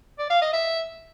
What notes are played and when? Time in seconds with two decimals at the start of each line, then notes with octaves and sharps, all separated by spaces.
0.19 D5
0.30 F5
0.42 D#5
0.53 E5